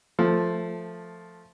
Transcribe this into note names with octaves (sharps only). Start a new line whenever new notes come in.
F3 A3